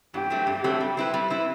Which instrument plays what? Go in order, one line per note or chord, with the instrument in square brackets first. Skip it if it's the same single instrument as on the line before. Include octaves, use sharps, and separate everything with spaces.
[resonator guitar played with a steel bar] G2 [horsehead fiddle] G4
[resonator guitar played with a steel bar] F#3 A3 C4
G2
F#3 A3 C4
G3
C4 E4 B4
G3
C4 E4 B4